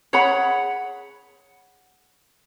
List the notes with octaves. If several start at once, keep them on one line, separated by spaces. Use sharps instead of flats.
G#4 C#5 F#5 B5